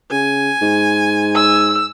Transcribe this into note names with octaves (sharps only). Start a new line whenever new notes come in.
C#3 G#5
G#2
E6